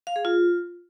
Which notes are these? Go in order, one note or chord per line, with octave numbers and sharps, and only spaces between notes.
F5
G#4
F4